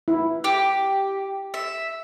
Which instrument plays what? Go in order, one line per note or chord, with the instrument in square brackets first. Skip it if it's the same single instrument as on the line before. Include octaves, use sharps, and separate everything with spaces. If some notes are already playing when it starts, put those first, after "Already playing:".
[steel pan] E4
[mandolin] G4
E5